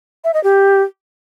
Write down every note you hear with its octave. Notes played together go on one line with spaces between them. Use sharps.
E5
D#5
G4